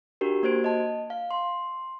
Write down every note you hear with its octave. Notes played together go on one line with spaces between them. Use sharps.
D4 F#4 G4 A#4
A#3 F#4 C5 G#6 D7
D#5 A5
F5
C6